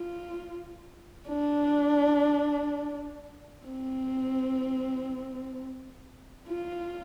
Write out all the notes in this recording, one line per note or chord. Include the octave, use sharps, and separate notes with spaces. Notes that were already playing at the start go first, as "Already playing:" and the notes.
Already playing: F4
D4
C4
F4